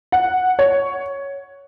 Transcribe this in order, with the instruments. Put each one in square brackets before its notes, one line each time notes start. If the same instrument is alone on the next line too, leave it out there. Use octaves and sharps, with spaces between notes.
[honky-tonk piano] F#5
C#5